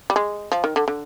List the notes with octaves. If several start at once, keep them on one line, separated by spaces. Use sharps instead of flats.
G3
G#3
F3
D#3
D3
D3